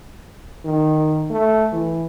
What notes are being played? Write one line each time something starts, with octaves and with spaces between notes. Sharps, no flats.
D#3
A3
E3